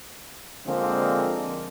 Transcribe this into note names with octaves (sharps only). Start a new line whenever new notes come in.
D3 F3 G#3 A#3 C4